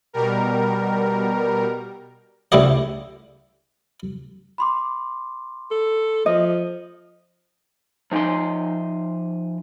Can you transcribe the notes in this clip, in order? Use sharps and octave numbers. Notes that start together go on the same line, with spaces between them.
B2 G3 A#4
C#2 D3 E4 G4 D#5
B5 C6 D6
A4
F3 D#5
F3 D#4 E5 G#5 C6